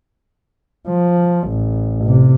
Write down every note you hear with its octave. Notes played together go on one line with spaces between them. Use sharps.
F3
A1
C3